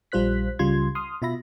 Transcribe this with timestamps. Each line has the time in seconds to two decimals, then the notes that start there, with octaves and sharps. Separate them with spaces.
0.12 A#1 G3 F4 C5 F#6 B6
0.59 C#2 C#3 G3 F4 C6 G#6
0.95 C6 D#6 F6
1.22 B2 F4 E5 B5 A#6